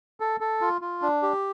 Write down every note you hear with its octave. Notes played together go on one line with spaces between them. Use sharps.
A4
A4
F4
F4
D4
G4